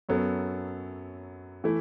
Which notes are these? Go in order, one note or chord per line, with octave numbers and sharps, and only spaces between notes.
F#2 F#3 B3 A4
E3 A3 E4